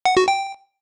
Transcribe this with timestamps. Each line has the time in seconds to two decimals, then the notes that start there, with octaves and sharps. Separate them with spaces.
0.05 F#5
0.17 F#4
0.28 G5